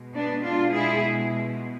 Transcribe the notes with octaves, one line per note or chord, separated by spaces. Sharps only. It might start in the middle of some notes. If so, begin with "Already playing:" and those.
Already playing: B2 G#3
B3 D4
D4 F4
E4 G#4